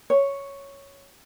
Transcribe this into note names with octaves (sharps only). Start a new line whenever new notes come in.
C#5